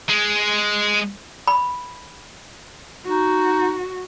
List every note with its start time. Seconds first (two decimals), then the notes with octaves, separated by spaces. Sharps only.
0.09 G#3
1.48 B5
3.06 D#4 F#4